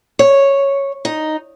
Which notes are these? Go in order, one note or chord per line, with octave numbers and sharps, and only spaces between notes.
C#5
D#4